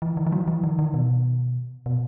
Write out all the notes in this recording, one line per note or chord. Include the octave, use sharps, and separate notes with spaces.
E3
D#3
E3
F#3
E3
D#3
D#3
B2
B2